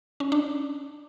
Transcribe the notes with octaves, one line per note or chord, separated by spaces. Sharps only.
C#4
D4